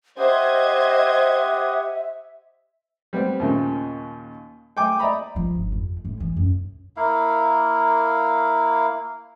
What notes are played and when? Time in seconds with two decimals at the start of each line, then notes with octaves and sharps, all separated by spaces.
0.18 G4 C5 D#5 E5 F#5 D#6 G#6
3.13 G3 B3 C4
3.40 D#2 A#2 C#3
4.77 G5 G#5 D6
4.99 D5 D#5 A#5 B5
5.36 F3
5.55 G1
5.72 F2
6.05 A2
6.20 E3
6.37 F#2
6.97 A#3 E4 F5